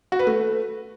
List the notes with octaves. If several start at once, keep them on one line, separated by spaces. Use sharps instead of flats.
F#4
B4
A3